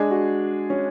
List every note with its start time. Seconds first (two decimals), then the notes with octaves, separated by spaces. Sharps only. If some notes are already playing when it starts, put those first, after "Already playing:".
Already playing: G#3 D4 G#4
0.11 F#4
0.70 C#4